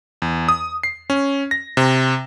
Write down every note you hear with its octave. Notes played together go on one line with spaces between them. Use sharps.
E2
D#6
C7
C#4
A#6
C3